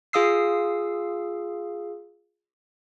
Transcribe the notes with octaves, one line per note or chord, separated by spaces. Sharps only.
F4 G#4 F5 D#6 E6 C7